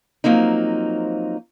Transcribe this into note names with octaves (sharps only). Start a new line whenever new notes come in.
F3 F#3 A#3 C4 D#4